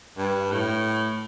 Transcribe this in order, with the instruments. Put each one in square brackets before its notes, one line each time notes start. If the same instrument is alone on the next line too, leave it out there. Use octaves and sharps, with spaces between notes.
[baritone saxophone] G2
A2